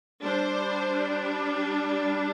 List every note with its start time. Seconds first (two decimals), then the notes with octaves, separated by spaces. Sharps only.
0.23 G3 D4 C5